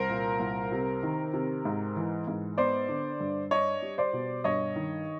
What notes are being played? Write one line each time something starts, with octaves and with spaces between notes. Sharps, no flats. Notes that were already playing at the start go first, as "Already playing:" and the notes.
Already playing: C2 A#4 C5
A#2
C2
C3
D#3
C3
G#2
E3
G#2
B3 C5 D5
D3
G2
D4 C#5 D#5
G3
C5 D5
B2
G2 C#5 D#5
D#3